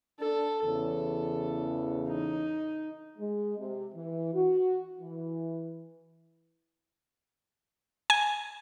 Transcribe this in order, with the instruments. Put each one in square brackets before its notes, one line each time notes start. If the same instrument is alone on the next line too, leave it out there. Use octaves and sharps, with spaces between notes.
[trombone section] D4 [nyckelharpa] A4
[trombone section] E2 C#3 E3 [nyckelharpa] A4
[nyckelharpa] D#4
[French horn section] G#3
C3
E3
F#4
E3
[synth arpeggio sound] G#5